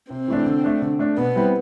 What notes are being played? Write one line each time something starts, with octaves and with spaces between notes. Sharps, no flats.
C3 C4
E3 A3 D4
D3
A3 D4
D3
A3 D4
B2 B3
G3 C4 E4